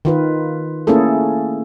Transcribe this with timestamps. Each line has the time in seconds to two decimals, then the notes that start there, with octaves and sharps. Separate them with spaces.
0.05 D#3 F4 B4
0.87 A3 A#3 C#4 E4 G#4 A4